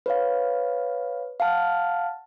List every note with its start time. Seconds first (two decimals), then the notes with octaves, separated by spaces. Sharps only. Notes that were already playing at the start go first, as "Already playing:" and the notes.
0.06 B4 C#5 F5
1.40 F5 F#5 A5 F6